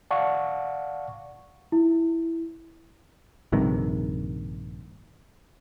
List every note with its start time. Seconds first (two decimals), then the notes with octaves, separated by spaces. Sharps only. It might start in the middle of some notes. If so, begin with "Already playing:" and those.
0.11 D5 F5 F#5 A5 C#6
1.72 E4
3.52 A#1 G2 C3 D#3